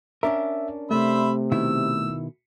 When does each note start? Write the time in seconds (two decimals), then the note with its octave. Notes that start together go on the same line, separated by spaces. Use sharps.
0.23 C#4 D4 A#4 E5
0.91 C3 A3 C5 E5 B5
1.52 B2 D#3 E4 E6